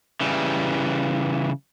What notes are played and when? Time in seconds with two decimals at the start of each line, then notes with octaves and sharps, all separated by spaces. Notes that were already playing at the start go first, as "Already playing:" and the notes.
0.21 C#3 E3 G3